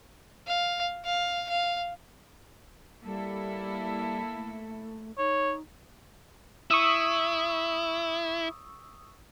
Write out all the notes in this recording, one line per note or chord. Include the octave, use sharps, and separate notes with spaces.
F5
F5
F5
G3 A#3 E4 A4
A3
D#4 C#5
E4 C#6 D#6 E6